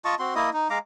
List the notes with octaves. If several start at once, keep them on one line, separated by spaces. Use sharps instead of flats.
F4 D#5 A5 C#6
C4 F#4 C6
A#3 E4 D#5
D#4
G#3 F5 A#5 D6